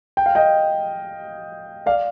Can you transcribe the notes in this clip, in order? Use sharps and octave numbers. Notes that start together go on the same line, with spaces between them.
G5
F5
D#5 G5
D5 F5